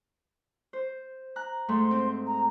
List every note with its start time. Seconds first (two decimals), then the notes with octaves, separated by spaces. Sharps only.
0.73 C5
1.36 A#5 F#6
1.69 G#2 A3 C6
1.91 C4
2.26 A#5